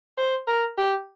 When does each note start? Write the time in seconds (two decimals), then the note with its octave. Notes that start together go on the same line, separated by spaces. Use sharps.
0.18 C5
0.47 A#4
0.78 G4